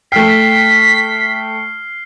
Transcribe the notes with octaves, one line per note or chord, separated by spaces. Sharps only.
A3 G5 F6 B6 C7